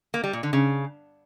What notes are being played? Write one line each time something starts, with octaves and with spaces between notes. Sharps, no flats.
A#3
G3
A#2
D3
C#3